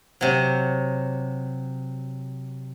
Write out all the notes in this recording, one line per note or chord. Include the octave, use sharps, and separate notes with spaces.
C3 F#3